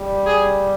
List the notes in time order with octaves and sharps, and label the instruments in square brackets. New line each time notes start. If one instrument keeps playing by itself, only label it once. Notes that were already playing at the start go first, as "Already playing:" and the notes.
Already playing: [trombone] G3
[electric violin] G#4